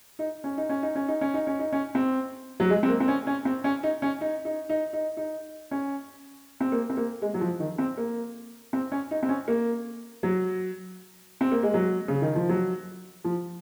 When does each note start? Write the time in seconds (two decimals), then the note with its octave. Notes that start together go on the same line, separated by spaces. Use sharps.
0.19 D#4
0.44 C#4
0.57 D#4
0.69 C#4
0.83 D#4
0.95 C#4
1.08 D#4
1.21 C#4
1.34 D#4
1.47 C#4
1.59 D#4
1.73 C#4
1.95 C4
2.60 F#3
2.70 G#3
2.83 C4
2.89 A#3
3.00 C4
3.08 C#4
3.27 C#4
3.45 C4
3.64 C#4
3.83 D#4
4.02 C#4
4.21 D#4
4.45 D#4
4.69 D#4
4.93 D#4
5.17 D#4
5.71 C#4
6.60 C4
6.72 A#3
6.90 C4
6.97 A#3
7.22 G#3
7.34 F#3
7.41 F3
7.60 D#3
7.78 C4
7.97 A#3
8.73 C4
8.92 C#4
9.11 D#4
9.23 C4
9.29 C#4
9.48 A#3
10.23 F#3
11.41 C4
11.52 A#3
11.63 G#3
11.74 F#3
12.08 C#3
12.22 D#3
12.35 F3
12.49 F#3
13.24 F3